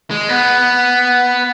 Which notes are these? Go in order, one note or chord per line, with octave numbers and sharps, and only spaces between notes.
G#3
B3